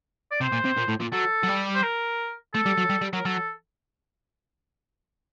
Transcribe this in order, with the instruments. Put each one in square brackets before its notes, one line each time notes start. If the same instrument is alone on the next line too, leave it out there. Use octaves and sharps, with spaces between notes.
[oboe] D5
[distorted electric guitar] C3 [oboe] C5
[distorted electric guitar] A#2
C3
A#2
A2
A#2
[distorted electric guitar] F#3 [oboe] A4
[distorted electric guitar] F#3
G3
[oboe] C5
A#4
[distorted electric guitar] A3 [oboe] A4
[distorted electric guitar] G3
F#3
G3
G3
[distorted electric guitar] F#3 [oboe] A#4
[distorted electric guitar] F#3 [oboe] A4